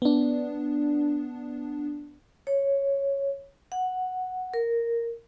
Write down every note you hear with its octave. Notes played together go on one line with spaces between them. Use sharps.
B3 D4
C#5
F#5
A#4